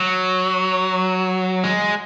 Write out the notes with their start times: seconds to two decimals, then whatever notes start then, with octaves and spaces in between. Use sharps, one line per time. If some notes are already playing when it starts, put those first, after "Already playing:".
Already playing: F#3
1.64 G#3